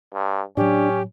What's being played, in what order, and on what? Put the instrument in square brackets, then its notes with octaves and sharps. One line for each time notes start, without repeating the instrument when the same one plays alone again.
[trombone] G2
[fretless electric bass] A2 F#3 [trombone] C#4 [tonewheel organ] D4 [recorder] G4